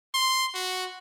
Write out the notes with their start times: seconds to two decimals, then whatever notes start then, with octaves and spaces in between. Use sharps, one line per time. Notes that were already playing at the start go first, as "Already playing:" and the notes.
0.14 C6
0.54 F#4